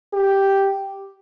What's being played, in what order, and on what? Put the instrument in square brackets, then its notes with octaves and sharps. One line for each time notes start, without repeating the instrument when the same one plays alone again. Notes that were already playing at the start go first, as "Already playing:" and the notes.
[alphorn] G4